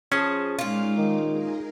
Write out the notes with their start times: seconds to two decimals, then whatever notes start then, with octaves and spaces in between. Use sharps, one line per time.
0.12 F3 C#4 G#4 A5
0.59 A#2 G#3 D#4 F4 D6
0.98 D#3
1.30 D#4 G#4 A#4